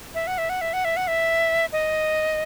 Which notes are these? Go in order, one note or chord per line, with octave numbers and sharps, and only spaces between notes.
E5
F#5
E5
F#5
E5
F#5
E5
F#5
E5
D#5